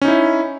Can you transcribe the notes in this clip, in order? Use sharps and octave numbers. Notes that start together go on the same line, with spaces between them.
C#4 D#4 E4